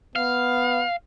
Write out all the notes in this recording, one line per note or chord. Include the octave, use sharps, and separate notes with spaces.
B3 F5